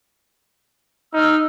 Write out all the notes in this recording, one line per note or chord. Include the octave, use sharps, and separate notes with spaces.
D#4 E6 F6